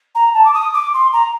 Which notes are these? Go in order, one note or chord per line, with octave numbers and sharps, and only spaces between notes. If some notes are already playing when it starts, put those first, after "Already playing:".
A#5
A5
D6
D#6
D6
C6
A#5